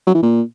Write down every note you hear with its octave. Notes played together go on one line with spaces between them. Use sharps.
F#3
E3
A#2